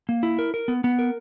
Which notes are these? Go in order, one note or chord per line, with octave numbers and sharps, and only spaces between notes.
A#3
E4
A#4
A#4
B3
B3
A#4